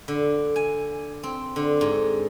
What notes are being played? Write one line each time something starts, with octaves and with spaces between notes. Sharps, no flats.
D3
G#5
C4
D3
G#2